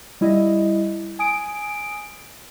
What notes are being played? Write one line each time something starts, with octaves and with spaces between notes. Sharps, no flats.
G3 E4 D#5
G#5 D#6 D7